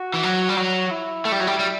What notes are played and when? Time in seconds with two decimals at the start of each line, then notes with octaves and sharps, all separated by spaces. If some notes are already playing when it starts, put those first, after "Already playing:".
Already playing: F#4
0.14 E3
0.23 F#3
0.49 G3
0.57 F#3 F#4
0.87 F#4
0.91 E4
1.25 A3
1.32 G3
1.40 F#3
1.47 G3
1.59 G3